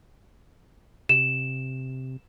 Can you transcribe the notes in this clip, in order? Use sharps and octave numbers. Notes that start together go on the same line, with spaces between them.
C3 E7